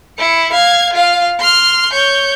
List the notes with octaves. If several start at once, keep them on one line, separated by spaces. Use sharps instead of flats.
E4 C#7
F5 G#6
F4 F5
C6 F6
C#5 G6